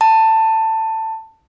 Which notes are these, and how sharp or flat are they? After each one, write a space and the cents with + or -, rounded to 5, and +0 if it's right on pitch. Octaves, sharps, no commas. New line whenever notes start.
A5 +15